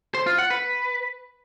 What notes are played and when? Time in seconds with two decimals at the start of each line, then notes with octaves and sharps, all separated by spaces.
0.14 C5
0.26 F4
0.38 F#5
0.50 B4